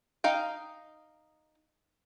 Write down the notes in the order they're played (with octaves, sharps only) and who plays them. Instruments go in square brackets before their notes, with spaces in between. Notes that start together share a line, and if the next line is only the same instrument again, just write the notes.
[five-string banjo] D#4 F5 G5